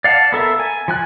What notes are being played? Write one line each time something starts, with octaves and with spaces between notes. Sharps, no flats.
D5 F5 F#5 A5
B3 A4 A#4 E5
G#5
F3 G#5 F#6